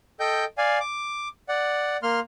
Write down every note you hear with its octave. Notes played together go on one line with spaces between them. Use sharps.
A4 D#5 G5 G6
D5 F5 G#5
D6
D5 F#5
A#3 C6 F6